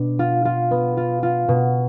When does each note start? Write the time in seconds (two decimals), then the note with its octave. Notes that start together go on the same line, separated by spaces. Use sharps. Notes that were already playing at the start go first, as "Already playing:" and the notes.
Already playing: B2 D4
0.19 F4
0.45 F4
0.71 B3
0.97 F4
1.23 F4
1.48 B2